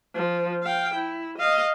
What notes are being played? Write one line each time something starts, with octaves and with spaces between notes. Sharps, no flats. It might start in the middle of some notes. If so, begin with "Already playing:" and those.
F3
F5 G5
E4
D#5 F5